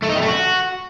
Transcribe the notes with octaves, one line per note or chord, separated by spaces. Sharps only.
A3
D#4
G3
A3
F#4